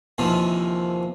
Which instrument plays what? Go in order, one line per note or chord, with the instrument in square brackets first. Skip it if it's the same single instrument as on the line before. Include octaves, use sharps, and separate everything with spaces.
[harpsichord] D#2 C3 E3 F3